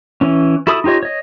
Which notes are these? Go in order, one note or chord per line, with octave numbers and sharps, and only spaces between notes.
E3 C#4
E4 F#4 A4 B5 D#6
D#4 F4 G4 C#5 D#5
C#5 D#5